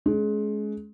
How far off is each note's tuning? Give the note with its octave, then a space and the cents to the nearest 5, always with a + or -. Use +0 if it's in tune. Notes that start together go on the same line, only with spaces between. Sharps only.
G#3 +25 C#4 +20